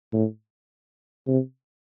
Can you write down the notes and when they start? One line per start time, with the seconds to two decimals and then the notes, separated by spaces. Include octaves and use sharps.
0.13 A2
1.27 C3